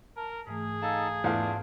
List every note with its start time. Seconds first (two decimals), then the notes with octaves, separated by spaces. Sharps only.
0.17 A#4 A5
0.47 G#2 E3 A3 G#4
0.82 D#4 A4 F5 A5 E6
1.24 E2 G#2 A3 D4 F4 F5